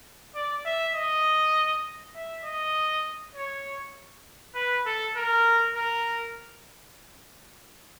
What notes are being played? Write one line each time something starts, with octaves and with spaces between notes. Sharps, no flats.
D5
E5
D#5
E5
D#5
C#5
B4
A4
A#4
A#4